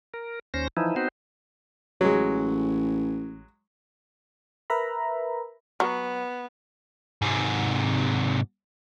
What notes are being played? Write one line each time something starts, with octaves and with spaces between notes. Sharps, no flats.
A#4
D#2 C#4 C5 A#6
E3 F3 D#4 E4
B3 C4 D#4 F#4 C5
A1 F#3 G#3
A#4 B4 E5 A#5 B5
F#3 B3
G#2 C3